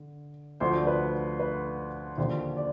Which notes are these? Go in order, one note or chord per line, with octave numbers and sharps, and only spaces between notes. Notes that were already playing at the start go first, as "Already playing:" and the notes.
Already playing: D3
D2 D3 F3 C5
B4
B4
D#2 D3 F3 C5
D5